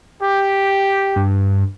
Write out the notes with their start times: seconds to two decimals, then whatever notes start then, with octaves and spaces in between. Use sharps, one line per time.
0.22 G4
1.16 G2